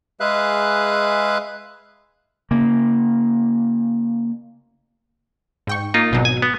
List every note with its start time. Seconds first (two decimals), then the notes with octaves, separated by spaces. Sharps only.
0.20 G#3 G#4 B4 E5 F5 F#6
2.51 C#3 A#3
5.67 G#2 G5 C#6
5.94 A#3 D#4 F4
6.11 G#1 B2 F#3
6.25 G#5
6.42 B3